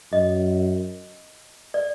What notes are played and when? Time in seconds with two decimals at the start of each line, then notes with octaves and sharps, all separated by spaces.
0.12 F#2 D#5
1.74 D5